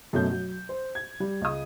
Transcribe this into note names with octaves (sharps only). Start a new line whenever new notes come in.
F#2 B2 F#3 A3 C#4 G6
F#3
C5
G#6
G3
C#2 D#6